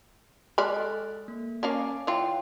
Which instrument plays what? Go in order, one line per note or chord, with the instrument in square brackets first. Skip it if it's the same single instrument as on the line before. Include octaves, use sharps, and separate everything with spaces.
[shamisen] G#3 D5 B5 [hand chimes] F6 F#6
[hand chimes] A4 D#5
A#3
[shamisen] A#3 C#4 F5 [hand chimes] G#5 A5 D6
[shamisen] E3 F4 [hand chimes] C#5 F#5 G5